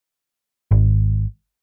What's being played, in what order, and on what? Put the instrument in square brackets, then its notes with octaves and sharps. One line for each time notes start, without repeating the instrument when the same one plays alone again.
[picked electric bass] G#1